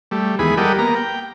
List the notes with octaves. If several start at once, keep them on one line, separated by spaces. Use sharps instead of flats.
G3 A3
D#2 E3 G#3 B3 G#4 B5
G3 G4 A4 A#4 D#5 F#5
A#3 B3 A#5
G5